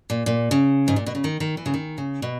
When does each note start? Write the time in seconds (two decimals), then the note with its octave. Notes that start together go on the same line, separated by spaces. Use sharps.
0.10 A#2
0.26 A#2
0.51 C#3
0.88 G#2
0.96 A#2
1.06 B2
1.15 C#3
1.24 D#3
1.40 D#3
1.57 E3
1.66 C#3
1.74 D#3
1.98 C#3
2.22 B2